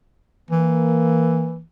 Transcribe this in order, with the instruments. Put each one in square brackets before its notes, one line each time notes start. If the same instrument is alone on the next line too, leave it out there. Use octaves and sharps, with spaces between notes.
[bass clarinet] E3 [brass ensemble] A#3